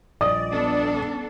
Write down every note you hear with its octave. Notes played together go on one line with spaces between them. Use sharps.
D#1 A#1 D5 D#5 D#6
B3 D4 A4